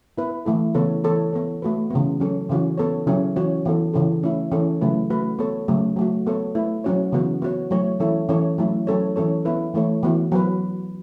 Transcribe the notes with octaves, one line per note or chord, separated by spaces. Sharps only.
B3 E4 B4
E3 A3 E4 A4
C#3 E3 B3 A4 C#5
E3 B3 A4 C#5
B3 A4 C#5
A3 F#4 B4
C#3 E3 B3
F#3 C#4 A4
C#3 E3 C#4 F#4
B3 A4 C#5
C#3 F#3 C#4 E4
E3 C#4 F#4 C#5
E3 B3 A4
C#3 E3 C#4 A4
A3 C#4 E4
E3 C#4 A4
C#3 F#3 A3 E4 B4
A3 F#4 B4
B3 A4 C#5
C#3 F#3 A3
F#3 A3 F#4
B3 A4 C#5
A3 E4 B4
F#3 C#4 F#4 C#5
C#3 E3 B3 F#4
B3 F#4 C#5
F#3 A3 E4 C#5
E3 C#4 E4 A4 C#5
E3 C#4 A4 C#5
F#3 A3 E4
F#3 C#4 A4 C#5
E3 C#4 A4 C#5
B3 E4 B4
E3 A3 E4 A4 C#5
E3 B3 F#4
F#3 B3 F#4 B4